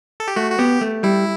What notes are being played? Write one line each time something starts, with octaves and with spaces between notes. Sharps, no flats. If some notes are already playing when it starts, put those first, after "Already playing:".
A4
G4
A3 F#4
F#4
B3 G4
A3
G3 E4